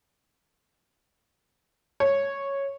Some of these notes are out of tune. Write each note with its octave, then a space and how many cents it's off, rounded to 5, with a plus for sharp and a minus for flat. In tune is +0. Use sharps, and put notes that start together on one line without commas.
C#5 -5